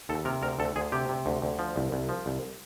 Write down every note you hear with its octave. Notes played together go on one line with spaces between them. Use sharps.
D#2 A4
C3 A#4
D2 A#4
D2 A4
D2 G#4
C3 G4
C3
D2
D2
F3
C2
C2
F3
C2